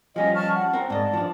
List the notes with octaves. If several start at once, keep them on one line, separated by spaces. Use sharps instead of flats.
F3 G3 C#4 D#5 G#5
A5 C#6 F6
F#5
C4 A#4
G#2 D5 D#5 A5
F3 D4